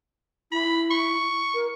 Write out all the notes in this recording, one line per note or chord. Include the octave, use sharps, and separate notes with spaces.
E4 B5
C#6
A#4